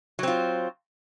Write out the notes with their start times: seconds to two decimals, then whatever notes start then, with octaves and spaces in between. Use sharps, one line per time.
0.19 F#3
0.23 C4
0.28 F4